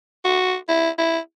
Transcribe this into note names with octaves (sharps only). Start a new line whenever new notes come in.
F#4
E4
E4